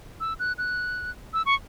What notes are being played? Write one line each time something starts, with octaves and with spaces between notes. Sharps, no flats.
E6
F#6
F#6
E6
C#6